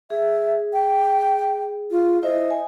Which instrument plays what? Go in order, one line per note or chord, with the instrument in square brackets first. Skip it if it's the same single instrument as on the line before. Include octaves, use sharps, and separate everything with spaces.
[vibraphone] G#4 [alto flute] E5
[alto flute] G5
F4
[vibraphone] E4 C5 E5 [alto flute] D#5
[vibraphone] G#5